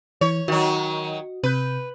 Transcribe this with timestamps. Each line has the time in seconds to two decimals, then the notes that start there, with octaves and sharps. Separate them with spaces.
0.21 E3 C#5
0.48 D#3 F#3 F#4 D#5
1.43 C3 B4 G6